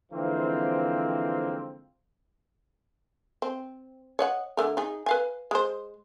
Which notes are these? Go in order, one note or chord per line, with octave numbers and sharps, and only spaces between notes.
D3 E3 F3 G#3 A#3 C4
C4
C#5 D#5 F#5
D3 A3 A#4
D#4 G#4
B4 F5 G#5
G#3 C5